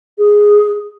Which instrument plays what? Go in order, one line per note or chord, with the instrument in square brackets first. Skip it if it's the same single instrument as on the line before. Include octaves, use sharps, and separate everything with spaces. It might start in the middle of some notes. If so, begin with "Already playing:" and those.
[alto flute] G#4